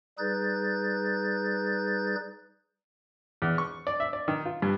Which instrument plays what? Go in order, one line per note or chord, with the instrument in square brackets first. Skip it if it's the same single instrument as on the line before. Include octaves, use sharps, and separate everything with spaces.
[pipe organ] G3 D#4 G#4 B4 G6 A6
[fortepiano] E2
C#6
D5
E5
D5
D#3
F4
G2